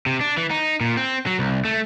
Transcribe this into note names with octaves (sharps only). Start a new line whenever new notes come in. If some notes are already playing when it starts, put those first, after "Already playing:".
C3
D4
E3
D#4
A#2
C4
F#3
C2
A3